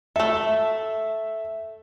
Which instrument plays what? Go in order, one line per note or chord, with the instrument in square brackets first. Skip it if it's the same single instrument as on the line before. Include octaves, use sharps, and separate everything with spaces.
[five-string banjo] A3 A4 [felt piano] E5